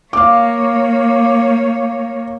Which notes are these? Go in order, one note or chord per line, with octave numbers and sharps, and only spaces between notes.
A#3 C#5 F5 D6